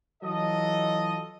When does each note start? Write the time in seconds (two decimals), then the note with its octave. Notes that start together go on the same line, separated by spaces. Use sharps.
0.23 E3 F#3 F4 A4 D#5